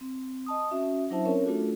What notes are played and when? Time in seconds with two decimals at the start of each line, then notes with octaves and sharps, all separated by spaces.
0.01 C4
0.46 D#5 A5 D#6
0.71 C#4 F#4 E5
1.10 F#3 D4 E4 C5 E5 A5
1.25 C4 C#4 A#4 C#5
1.44 A3 D4 F4 F#4 A4